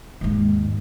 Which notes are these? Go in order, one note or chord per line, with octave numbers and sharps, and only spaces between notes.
D#2 G#2